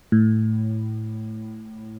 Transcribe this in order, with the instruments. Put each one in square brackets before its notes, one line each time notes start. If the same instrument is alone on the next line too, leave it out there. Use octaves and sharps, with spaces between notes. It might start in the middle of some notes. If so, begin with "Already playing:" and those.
[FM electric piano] A2